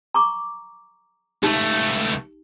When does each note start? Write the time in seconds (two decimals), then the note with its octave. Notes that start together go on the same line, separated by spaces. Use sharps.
0.14 A#5 C#6 D6
1.43 C#2 A3 D#4 G4